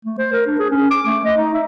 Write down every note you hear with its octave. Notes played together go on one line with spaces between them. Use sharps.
A3
C5
A#4
D4
G#4
C#4
D6
A3
D#5
D#4
E5